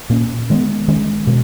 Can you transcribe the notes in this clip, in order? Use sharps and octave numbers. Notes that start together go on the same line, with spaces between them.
A#2 A#3 C#4
D#3 G#3 B3
D#3 G#3 C#4
B2 G#3